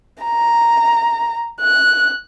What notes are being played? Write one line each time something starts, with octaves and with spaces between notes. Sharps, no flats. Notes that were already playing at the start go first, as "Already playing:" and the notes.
A#5
F#6